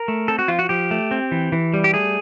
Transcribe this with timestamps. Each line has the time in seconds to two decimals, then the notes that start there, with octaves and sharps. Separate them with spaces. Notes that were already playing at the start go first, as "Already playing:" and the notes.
Already playing: A#4
0.08 A3
0.28 C4 A4
0.39 F#4
0.48 F3 F4
0.59 F#4
0.69 F3 G4
0.91 A3
1.11 C4
1.32 E3
1.52 E3
1.74 G3
1.84 G4
1.94 A3 G#4